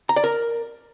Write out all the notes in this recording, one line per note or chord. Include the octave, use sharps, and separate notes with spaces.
A#5
D5
A#4